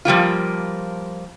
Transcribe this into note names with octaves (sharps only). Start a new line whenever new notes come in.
F3 G3 A#3 F4